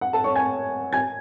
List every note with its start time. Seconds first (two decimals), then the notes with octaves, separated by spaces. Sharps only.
0.01 F#5
0.13 A4 A5
0.24 C#5 C#6
0.36 G#5 G#6
0.93 G#5 G#6